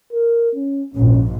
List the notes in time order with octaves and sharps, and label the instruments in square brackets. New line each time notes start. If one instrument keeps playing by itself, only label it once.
[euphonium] A#4
C#4
[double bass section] A#1 G#2 [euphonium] C#4